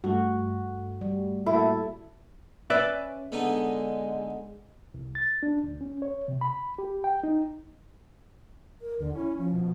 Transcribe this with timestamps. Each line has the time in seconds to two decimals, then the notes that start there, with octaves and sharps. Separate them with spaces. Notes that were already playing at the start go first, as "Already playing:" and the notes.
0.04 G2 A3 F#4
1.01 G3
1.46 A2 A#3 E4 F#4 A4
2.70 C#4 B4 D5 E5
3.32 D3 G#3 B3 D#4
4.94 C2
5.15 A6
5.43 D4
5.64 D2
5.81 C#4
6.02 C#5
6.28 C3
6.41 B5
6.78 G4
7.04 G5
7.23 D#4
8.81 A#4
8.99 D#2 D3
9.15 C#4 E4
9.38 F3
9.53 B2